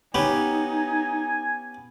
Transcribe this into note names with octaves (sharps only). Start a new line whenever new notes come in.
B3 C#4 D#4 G4 G#5